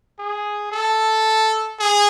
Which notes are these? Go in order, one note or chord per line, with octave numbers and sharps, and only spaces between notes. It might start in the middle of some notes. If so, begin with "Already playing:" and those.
G#4
A4
G#4